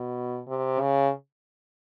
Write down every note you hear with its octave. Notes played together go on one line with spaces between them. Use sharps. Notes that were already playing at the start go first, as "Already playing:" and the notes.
Already playing: B2
C3
C#3